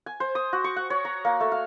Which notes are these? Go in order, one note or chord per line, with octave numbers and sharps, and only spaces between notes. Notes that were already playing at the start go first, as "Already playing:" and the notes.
G#5
C5
D#6
F#4
C#6
F#5
C#5
A#5
A#3
A3
F5